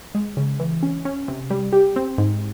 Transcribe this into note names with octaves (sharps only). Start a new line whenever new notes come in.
G#3
C#3
E3
C#4
C#4
C3
G3
G4
C4
G#2